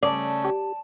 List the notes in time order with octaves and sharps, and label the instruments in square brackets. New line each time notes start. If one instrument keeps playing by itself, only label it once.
[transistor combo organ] C#3 A3 C#4 [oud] D5 [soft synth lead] A5
[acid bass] G4